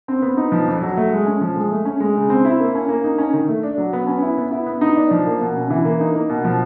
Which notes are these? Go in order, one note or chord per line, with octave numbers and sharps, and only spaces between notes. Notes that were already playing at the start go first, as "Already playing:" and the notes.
C4
B3
D#4
F3
F2
F#3
A3
G#3
C#4
F3
G#3
A3
C#4
G#3
C#3
C4
E4
A#3
C#4
A#3
D#4
C#4
D#3
A3
D4
F#3
B3
C#4
E4
B3
E4
B3
D#4
D4
F3
A#3
B2
C#4
E3
A#3
D#4
A#3
B2
F3